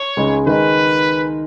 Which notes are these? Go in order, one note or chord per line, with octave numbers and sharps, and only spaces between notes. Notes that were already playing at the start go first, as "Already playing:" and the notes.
Already playing: C#5
C#2 C#3 G#3 D#4
D#3 G#3 D#4 B4